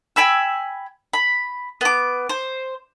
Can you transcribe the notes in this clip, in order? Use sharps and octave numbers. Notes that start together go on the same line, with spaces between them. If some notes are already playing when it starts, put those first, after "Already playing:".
G5 G#5 B5 E6
B5
B3 D6
C5